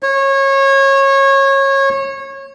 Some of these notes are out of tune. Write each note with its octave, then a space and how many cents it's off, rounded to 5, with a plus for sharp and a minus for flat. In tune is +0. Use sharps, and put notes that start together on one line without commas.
C#5 -25